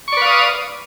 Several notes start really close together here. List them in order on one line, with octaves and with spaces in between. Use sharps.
C#6 D5 B4 F5 D#6